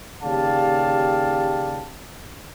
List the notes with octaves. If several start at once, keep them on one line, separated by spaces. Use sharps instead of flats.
D#2 C#3 G4 D5 F5 A5